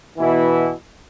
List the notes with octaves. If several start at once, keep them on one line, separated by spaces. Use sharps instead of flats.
B2 E3 E4